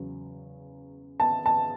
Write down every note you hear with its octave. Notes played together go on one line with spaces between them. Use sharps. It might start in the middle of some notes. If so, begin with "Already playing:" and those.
Already playing: E2 C#3 F#3
A5
A5